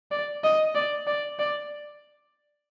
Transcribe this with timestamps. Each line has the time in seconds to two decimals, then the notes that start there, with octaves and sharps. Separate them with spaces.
0.11 D5
0.44 D#5
0.75 D5
1.07 D5
1.39 D5